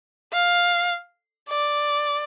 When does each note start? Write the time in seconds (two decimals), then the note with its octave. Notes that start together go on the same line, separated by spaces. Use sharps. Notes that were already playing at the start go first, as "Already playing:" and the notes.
0.33 F5
1.50 D5